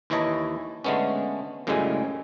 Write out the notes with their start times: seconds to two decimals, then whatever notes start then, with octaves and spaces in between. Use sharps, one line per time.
0.10 D#2 E3 E4 C#5 D#5 A5
0.84 D3 G#3 A3 B3 C#4
1.67 F#2 A2 C#3 G3 G#3 G#5